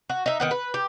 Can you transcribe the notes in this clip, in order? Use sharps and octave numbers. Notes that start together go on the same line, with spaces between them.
F#4
D#4 E5
D#3 B3 F#5
B4
G4